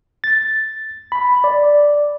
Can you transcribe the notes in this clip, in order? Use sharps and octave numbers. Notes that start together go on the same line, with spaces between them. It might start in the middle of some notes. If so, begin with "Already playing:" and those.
A6
B5
D5